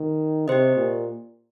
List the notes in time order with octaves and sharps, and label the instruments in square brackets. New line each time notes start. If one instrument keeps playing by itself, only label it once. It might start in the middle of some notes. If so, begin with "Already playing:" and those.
Already playing: [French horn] D#3
[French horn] C3 [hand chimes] G4 C5 D#5
[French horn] A#2